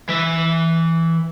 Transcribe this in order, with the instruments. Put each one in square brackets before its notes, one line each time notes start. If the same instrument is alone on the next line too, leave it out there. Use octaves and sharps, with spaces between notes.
[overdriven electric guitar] E3 E5